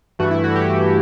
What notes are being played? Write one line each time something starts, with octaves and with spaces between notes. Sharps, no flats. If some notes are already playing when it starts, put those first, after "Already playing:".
G2 E3 A3 F#4
E4
F#4
G4